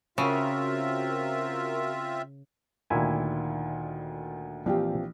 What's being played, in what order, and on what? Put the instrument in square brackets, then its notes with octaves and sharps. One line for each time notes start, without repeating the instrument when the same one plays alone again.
[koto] C#3 [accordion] C4 F4 E5 [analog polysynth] F#4 A#4
[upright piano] D2 D#3 [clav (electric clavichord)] A#2 E4 G#5
[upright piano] A#1 E3 [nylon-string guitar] C4 F4 G4